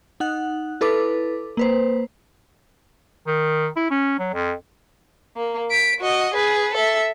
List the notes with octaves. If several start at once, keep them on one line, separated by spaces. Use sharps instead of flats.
D#4 F#5 F#6
E4 A4 B4 D6
A#3 B4 C5
D#3
E4
C#4
F#3
F2
A#3
B6 D7
F#4 D#5
G#4 B4
A4 E5